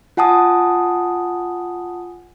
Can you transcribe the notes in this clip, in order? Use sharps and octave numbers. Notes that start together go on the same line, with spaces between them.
F4 F#5 G#5 A5 D#6